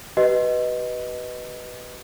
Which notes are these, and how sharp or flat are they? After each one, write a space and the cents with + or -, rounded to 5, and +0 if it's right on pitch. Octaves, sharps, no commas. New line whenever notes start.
G4 -40 B4 +0 D#5 +0